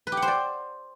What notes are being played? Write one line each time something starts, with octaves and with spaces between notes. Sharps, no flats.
B4
G4
F#5
C5
D5